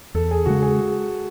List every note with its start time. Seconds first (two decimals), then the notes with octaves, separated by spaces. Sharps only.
0.14 E2 A4
0.31 G#4
0.46 C#3 G#3 F#4
0.62 G#4